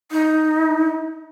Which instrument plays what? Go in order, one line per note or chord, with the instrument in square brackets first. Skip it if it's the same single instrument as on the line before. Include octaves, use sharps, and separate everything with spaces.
[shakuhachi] D#4